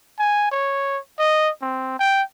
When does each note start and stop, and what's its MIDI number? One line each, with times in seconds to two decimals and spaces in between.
0.19 0.51 80
0.52 0.98 73
1.19 1.50 75
1.62 1.96 60
1.99 2.22 79